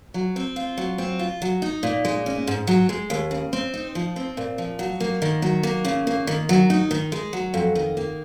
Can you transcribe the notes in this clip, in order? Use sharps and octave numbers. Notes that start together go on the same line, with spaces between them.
F#3
C4
F4
F#3
C4
F4
F#3
D#4
A#2
G#3
C#4
G#2
F#3
G#3
D#2
C#3
C4
D#4
F3
C4
A#2
F3
F#3
A#3
D#3
F#3
A#3
C#3
A#3
D#3
F#3
D#4
D#3
G#3
F#3
F2
D#3
A#3